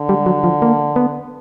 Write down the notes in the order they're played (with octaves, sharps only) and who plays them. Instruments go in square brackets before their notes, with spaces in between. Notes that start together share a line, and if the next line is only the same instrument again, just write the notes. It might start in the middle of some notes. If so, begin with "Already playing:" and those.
Already playing: [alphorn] D3
[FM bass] G3
F#3
F3
A#3
B3